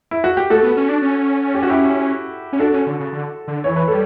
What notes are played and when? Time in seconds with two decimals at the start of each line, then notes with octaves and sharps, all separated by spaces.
0.11 E4
0.24 F#4
0.37 G4
0.50 A3 F#4 A4
0.63 B3
0.77 C#4
0.89 D4
1.02 C#4
1.55 G4
1.63 F#4
1.70 E4 G4
2.53 C#4
2.59 D4 F#4 A4
2.74 C#4
2.87 D3
3.00 C#3
3.13 D3
3.48 D3
3.64 E3 C#5
3.76 B4
3.88 G3 A4